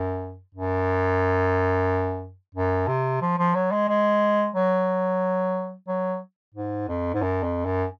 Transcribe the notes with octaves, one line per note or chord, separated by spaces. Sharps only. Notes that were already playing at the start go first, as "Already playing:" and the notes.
Already playing: F#2
F#2
F#2
C3
F3
F3
F#3
G#3
G#3
F#3
F#3
G#2
F2
G#2
F#2
F2
F#2